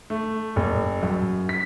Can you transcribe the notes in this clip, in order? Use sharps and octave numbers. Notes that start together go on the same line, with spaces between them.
A3
F#1
F#2
B6